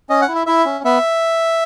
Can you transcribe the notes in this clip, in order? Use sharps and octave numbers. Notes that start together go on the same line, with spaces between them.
C#4 D#5
F#5
E4
E5
E4 E5
C#4
B3 E5